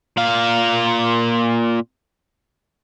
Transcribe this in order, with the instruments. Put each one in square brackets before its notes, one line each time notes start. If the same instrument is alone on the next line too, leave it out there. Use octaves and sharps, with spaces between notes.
[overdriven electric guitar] A#2 F5